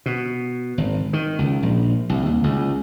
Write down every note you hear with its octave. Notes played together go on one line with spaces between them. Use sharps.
B2
G#1
D#3
C#2
A#1
C2
D#2
C#2